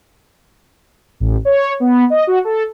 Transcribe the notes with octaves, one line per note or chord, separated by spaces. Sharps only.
A1
C#5
B3
D#5
F#4
A4